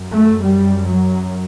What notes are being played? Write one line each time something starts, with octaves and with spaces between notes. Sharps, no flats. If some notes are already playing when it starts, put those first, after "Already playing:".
Already playing: F#2
A3
G3
F#3